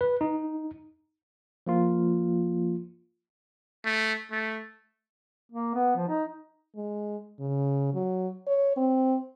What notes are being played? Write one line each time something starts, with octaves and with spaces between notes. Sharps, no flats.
B4
D#4
F3 A#3 F4
A3
A3
A#3
B3
F3
D#4
G#3
C#3
F#3
C#5
C4